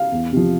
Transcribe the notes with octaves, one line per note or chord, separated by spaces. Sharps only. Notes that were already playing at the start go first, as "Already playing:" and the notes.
Already playing: F5
E2
C3 F3